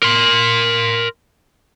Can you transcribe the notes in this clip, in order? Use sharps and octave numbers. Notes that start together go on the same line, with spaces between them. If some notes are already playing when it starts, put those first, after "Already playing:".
A#4 C6